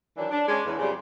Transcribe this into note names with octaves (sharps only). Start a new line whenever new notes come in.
D#3 E3 F#3 D4
D4
G#3 C#4 D5
E2
F2 C#3 F#3 G3 C5 D5